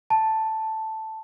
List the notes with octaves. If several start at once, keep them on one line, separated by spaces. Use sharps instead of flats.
A5